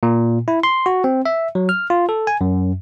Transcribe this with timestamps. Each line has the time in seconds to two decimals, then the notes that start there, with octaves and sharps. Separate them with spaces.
0.03 A#2
0.48 E4
0.63 C6
0.86 F#4
1.04 C4
1.26 E5
1.55 F#3
1.69 F6
1.90 F4
2.09 A4
2.27 G#5
2.41 F#2